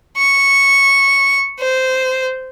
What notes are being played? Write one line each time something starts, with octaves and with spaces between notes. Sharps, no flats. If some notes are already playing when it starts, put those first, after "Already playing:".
C#6
C5